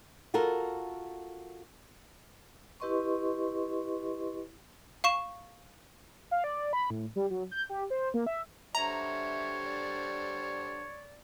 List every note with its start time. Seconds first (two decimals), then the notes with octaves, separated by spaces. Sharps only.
0.34 F4 F#4 A4 A#4
2.80 E4 G4 B4 D#5 C6 C#6
5.04 F5 C#6 E7
6.31 F5
6.44 D5
6.73 B5
6.90 A2
7.16 G3
7.30 F#3
7.51 G6
7.70 G4
7.90 C5
8.14 A#3
8.27 E5
8.75 D3 G3 C5 C#5 E5 A#5
9.67 D5